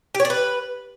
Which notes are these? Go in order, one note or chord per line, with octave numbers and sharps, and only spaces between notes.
G4
C#5
D5
B4